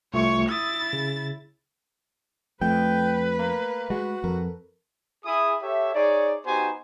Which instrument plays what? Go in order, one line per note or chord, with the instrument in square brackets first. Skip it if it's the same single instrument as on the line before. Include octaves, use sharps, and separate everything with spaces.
[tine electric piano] C2 A3 F4 [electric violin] C#5 C#6
[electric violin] E4 A6 [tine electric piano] D#6 E6
[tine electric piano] C#3
[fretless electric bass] F2 [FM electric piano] A3 [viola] B4 [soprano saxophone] G5
[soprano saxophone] A#3
[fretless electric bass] G#3 [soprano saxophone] F#4
[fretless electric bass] F2 [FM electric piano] A4 A#4
[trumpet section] E4 G#4 D#6
G4 A4 C#5 E5
D#4 G#4 C#5 D5
B3 D#4 F#4 G4 C5 G#5